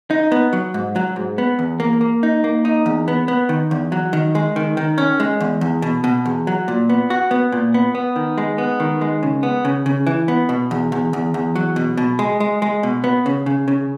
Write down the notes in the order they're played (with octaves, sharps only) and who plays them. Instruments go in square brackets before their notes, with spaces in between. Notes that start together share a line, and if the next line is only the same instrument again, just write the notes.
[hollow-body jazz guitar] D#4
B3
F#3
G#2
F#3
G#2
B3
E2
A#3
A#3
D#4
A#3
D#4
E2
B3
B3
D#3
E2
F#3
D#3
G#3
D#3
D#3
C#4
G#3
E2
E2
B2
B2
E2
F#3
A#2
B3
F#4
B3
A#2
B3
B3
D#3
G#3
B3
D#3
G#3
C#3
B3
C#3
C#3
E3
B3
B2
E2
E2
E2
E2
F#3
B2
B2
G#3
G#3
G#3
B2
B3
C#3
C#3
C#3